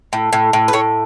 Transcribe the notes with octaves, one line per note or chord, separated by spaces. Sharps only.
A2
A2
A2
B4
A2 C#5